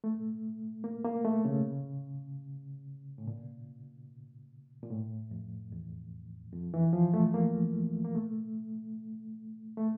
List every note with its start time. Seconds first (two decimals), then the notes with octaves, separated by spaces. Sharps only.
0.04 A3
0.84 A#3
1.04 A#3
1.25 A3
1.45 C#3
3.18 A2
3.27 A#2
4.83 A#2
4.90 A2
5.31 F2
5.72 E2
6.52 F2
6.74 E3
6.93 F3
7.14 A3
7.34 A#3
8.04 A#3
8.15 A3
9.77 A3